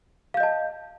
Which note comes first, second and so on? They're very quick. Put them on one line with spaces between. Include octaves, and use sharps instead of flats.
F5 G6 D#5 A5